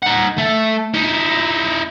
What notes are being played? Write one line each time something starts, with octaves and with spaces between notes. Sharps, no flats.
D#4 F#5
A3
D#4 E4